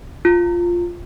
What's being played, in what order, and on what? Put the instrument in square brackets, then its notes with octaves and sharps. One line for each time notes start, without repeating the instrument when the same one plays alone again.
[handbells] F4